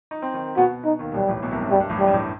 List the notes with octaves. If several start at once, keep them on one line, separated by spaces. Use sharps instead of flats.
D#4
C4
D#3 D#4
B2 B3 F#4
D#4
D#2 D#3
B1 B2 G3
A1 A2
B1 B2
C2 C3
G2
F#2 G3
G2
A1 A2
G3
G2
A1 A2